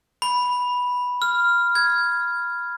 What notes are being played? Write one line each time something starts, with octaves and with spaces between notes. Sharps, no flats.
B5
F6
G#6